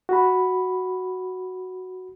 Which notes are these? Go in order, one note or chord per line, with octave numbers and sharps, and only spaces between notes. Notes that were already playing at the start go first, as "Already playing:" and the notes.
F#4 B5